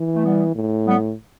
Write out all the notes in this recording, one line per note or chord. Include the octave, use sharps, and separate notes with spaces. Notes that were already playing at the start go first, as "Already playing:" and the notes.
Already playing: E3
A3
G3 B3
A2
G3 B3